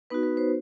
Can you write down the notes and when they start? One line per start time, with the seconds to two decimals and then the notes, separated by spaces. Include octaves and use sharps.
0.10 B3 D#4 F#4 B4
0.23 B4
0.37 C5